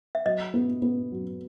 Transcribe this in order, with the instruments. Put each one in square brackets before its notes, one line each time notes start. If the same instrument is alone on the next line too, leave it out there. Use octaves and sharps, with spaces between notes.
[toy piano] E5
[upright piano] F#3 [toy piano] D#5
[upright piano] B3
B3
F#3